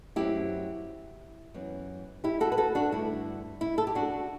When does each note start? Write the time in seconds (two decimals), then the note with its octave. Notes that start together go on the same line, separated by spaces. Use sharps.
0.16 F#2 F#3 A3 C4 E4 G4
1.54 F#2 E3 B3
2.24 E4 G4
2.40 F#4 A4
2.52 B4
2.57 F#4 A4
2.75 D4 F#4
2.92 G2 D3 A3 E4
3.61 E4
3.78 A4
3.87 G4
3.95 D4 F#4